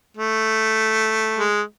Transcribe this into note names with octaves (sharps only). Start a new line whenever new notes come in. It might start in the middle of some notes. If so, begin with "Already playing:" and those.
A3
G#3